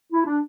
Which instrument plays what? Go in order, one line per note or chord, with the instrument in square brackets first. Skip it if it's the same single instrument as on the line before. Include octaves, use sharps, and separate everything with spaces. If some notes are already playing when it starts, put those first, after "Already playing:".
[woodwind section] E4
D4